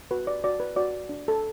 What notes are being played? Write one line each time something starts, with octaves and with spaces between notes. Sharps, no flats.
F#4 B4
D5
F#4 D5
B4
F#4 D5
D4
A4